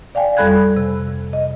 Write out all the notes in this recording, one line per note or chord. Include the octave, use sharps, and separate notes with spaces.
D5 F5 G5 G#5
F2 G3 A4 B5 F#6 G#6
C3
D#5